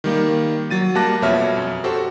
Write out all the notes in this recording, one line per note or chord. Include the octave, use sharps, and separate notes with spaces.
D#3 G3 A#3
F#3 A6 D#7
G3 A#3 A5 D6 F#6 A#6
F2 B2 C#5 E5 F6
F#2
F#4 G4 A4 C5